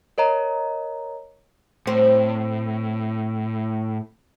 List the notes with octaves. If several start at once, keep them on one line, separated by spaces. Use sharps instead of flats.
A#4 C#5 D#5 A#5
A2 C4